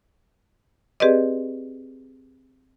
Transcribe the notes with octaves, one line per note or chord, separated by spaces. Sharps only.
C4 G4 G#4 B4 D5 D#5